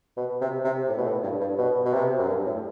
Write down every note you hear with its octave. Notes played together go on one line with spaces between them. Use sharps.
B2
C3
C3
A2
B2
A2
G2
G2
B2
B2
C3
F#2
G2
A2